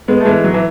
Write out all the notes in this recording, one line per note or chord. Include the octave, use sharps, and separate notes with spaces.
G#3 B3
A3
E3 G#3
F#3
E3